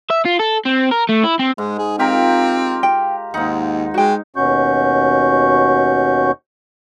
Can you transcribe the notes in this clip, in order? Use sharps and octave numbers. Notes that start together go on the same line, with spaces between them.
E5
F4
A4
C4
A#4
A3
E4
C4
G#2 G#3
G#4
C4 F4 G4 A#4
G5
D#2 G#2 D#4 F#5
G#3 F#4 G5
D#2 B2 C#4 F#4 C#6 G6